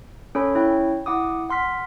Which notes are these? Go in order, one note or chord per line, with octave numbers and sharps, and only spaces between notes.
C#4 A4 C#5 B5
C#4 E4 C#5 G5
E4 F#5 D6 D#6
F#5 C6 F6 B6